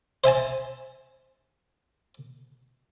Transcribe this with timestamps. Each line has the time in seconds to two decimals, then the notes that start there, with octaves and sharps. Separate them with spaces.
0.24 C5 E5 G#5 A5